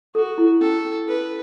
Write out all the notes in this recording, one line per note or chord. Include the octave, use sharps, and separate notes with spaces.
F#4 A4
E4
C#4 A4
C#4
A4 B4